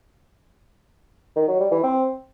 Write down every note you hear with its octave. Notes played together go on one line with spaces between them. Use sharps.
D#3
F#3
G3
E3
C4